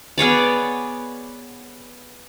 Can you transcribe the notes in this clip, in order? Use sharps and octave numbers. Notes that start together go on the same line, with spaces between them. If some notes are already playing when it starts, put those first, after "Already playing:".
B3 G#4 C#5 D5